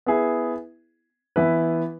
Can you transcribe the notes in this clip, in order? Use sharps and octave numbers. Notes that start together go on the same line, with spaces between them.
B3 E4 G#4
E3 B3 E4 B4